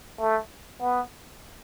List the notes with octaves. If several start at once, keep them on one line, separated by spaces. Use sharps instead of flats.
A3
B3